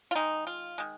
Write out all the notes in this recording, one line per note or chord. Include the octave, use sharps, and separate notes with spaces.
F4
D#3 G#3 D#4
F4
D#3 G#3